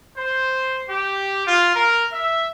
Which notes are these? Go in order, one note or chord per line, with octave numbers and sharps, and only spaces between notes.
C5
G4
F4
A#4
E5